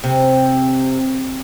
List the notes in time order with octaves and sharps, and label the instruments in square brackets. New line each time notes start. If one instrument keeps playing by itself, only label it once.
[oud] C3